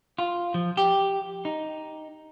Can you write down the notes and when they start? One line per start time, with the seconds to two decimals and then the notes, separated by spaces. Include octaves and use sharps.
0.18 F4
0.54 F3
0.77 G4
1.45 D#4